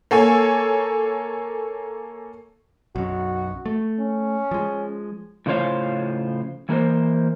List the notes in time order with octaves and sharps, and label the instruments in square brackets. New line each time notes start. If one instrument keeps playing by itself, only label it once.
[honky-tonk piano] A#3 A4 C#5 G#5
[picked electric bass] B1 F#2 [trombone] F#4
[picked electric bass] A3
[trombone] C#4
[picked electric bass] F3 G#3
[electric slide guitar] A2 C#3 F3 C5 C#5 F5
E3 A#3 G#4 A#4 C5